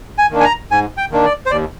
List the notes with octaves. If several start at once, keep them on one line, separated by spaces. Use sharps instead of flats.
G#5
D#3 A#3 D4
G#5
A#5
G#2 G#5
G5
D#3 A#3 D4
D5
C5
D#2 D5